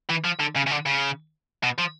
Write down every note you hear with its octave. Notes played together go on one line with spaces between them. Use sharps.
E3
F3
D3
C#3
C#3
D3
C#3
B2
F3